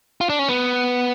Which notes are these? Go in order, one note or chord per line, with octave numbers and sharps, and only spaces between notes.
F4
D4
C#4
B3